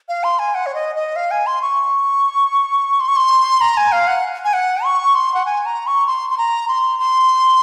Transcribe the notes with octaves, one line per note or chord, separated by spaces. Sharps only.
F5
C6
G#5
F#5
C#5
D#5
D#5
F5
G#5
C6
C#6
C6
C#6
C6
A#5
G#5
F5
F#5
G#5
F#5
C#6
C6
F#5
G#5
A#5
C#6
C6
C6
A#5
C6
C6